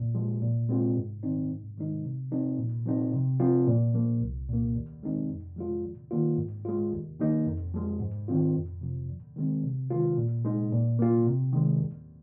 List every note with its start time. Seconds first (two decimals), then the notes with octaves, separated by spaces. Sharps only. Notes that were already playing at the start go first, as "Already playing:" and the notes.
Already playing: A#2
0.15 F3 G#3
0.42 A#2
0.69 G#3 C4 F4
0.96 G#2
1.23 D#3 C4 D#4
1.50 G#2
1.77 D#3 G#3 D#4
2.05 C3
2.31 F3 C4 D#4
2.58 A#2
2.86 F3 C4 D#4
3.13 C3
3.40 F3 C4 F4
3.67 A#2
3.94 F3 A#3
4.21 C2
4.49 A#2 A#3
4.75 D#2
5.03 D#3 G#3 C4 D#4
5.29 F2
5.56 F3 G#3 F4
5.84 D#2
6.11 D#3 A#3 F4
6.37 G#2
6.65 G#3 F4
6.93 D#2
7.19 D#3 A#3 D#4
7.46 F2
7.74 F3 G#3
8.00 G#2
8.28 D#3 C4 F4
8.55 F2
8.81 C3 F3
9.09 D#2
9.36 D#3 G#3 C4
9.64 C3
9.90 D#3 G#3 F4
10.17 A#2
10.45 G#3 D#4
10.72 A#2
10.99 A#3 F4
11.26 C3
11.53 D#3 G#3
11.80 D#2